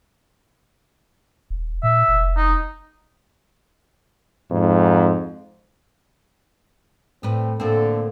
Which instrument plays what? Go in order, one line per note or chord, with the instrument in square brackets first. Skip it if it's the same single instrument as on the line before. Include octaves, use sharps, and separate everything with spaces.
[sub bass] D#1
[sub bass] A#2 [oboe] E5
[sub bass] F1
[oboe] D#4
[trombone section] F2 G#2
[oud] A2 B4 [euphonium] C4
[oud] A2 C4 [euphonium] D3 [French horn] A#3 [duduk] A4